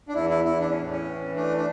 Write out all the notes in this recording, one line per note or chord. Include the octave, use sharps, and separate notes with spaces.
D4
E2 E4
E4
E2 E4
D4
C#4
A2
C#4
E3
A3 D4
D4